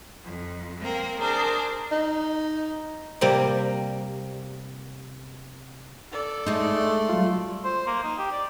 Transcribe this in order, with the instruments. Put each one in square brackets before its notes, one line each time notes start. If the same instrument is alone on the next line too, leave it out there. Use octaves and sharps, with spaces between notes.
[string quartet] F2
A#3 C4 A#4
[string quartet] D4 G#4 C5 [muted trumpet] A#4
[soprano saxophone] D#4
[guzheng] C3 G3 A#3 C4
[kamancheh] A4 D5
[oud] G#3 D#4 [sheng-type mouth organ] A3 C6
[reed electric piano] F#3 G3 F4
[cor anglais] C5
A#3
D#4
G4
D5